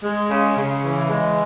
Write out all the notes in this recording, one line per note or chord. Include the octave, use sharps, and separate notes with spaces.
G#3
C#3
C#3
E3
G#3